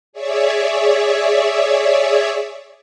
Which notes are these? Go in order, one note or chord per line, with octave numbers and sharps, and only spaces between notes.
G#4 C#5 D5 E5